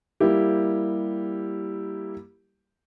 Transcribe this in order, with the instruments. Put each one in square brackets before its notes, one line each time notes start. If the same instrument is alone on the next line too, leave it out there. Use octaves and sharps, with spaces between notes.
[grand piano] G3 A#3 E4 G4